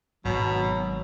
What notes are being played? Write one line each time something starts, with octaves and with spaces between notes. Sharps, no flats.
G#1 G#2 B2 F#3